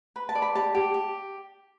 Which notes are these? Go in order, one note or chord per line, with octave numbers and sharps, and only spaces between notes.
B4 B5
A5
D5
B5
G4 A5
G4
G4